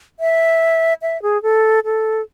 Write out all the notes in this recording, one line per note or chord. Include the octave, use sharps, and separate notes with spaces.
E5
E5
G#4
A4
A4